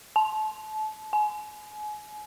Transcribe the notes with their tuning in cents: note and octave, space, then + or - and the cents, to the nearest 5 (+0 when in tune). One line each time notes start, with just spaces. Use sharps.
A5 -30
G#5 +30